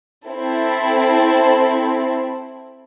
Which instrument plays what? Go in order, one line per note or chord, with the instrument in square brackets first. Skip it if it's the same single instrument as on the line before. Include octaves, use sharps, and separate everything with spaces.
[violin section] C4 E4 A4